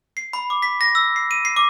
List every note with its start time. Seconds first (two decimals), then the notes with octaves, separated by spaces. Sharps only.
0.17 C7
0.33 B5
0.50 D6
0.62 B6
0.81 A#6
0.95 E6
1.16 C7
1.31 D#7
1.45 C7
1.56 D6